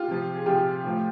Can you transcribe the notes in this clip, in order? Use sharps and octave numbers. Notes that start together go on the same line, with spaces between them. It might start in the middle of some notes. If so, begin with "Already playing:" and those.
Already playing: F4 G4
C3 F3
G#4
C3 F3 F4 G4
A2 F3